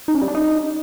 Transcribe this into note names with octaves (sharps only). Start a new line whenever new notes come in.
D#4
C#4
G3
D4
D#4